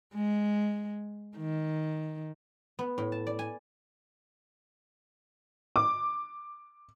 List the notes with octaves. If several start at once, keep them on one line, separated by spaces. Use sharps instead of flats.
G#3
D#3
B3
A2
A5
D5
G#5
D6